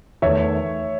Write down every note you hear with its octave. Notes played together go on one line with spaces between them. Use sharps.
E2 D#3 A3 C#5 E5